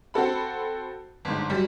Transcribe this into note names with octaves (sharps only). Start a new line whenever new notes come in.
C4 F#4 A4 B5
G1 G#2
F#2 G3